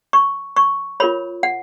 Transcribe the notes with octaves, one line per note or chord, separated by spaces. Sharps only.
C#6
C#6
F4 A#4 C#5 B5
F#5